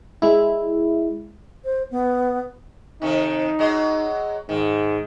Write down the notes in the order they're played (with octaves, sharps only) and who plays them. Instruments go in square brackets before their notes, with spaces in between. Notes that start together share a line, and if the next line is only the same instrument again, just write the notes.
[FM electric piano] G#3 E4
[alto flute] C5
B3
[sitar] C3 D#3 A4 [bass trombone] D#4
[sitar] F#3 G#3 D#5
[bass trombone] G#2 [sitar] D#3